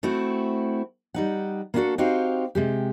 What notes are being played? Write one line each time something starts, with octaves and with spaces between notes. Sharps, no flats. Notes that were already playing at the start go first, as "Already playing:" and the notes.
A3 C4 E4 F#4
G3 D#4 F#5
A#3 B3 D4 F4 F#4 A4
C4 D#4 F#4 G4 C5 F5
C3 G#3 G4